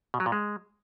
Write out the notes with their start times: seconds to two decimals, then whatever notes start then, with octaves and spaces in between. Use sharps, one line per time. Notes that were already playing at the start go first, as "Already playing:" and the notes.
0.14 B2
0.20 F#3
0.26 A#2
0.32 G#3